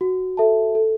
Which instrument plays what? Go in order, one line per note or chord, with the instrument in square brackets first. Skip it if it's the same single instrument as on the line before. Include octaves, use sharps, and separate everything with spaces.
[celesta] F#4
A4 E5 A5
A4